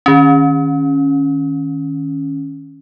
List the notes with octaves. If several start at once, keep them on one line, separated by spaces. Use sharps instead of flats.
D#3 C#4